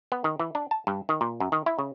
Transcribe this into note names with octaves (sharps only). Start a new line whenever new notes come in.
B3
D#3
E3
D4
A5
G2
D#3
A#2
F#2
D#3
E4
C#3